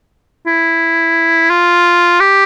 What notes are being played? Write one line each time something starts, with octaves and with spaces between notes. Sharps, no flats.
E4
F4
G4